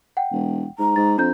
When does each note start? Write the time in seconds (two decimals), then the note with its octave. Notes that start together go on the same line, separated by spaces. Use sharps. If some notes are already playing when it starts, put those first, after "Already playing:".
0.17 F#5 G5
0.31 E1
0.79 G#2 A#5
0.96 G#2 A6
1.18 F2 D4 A#5 G6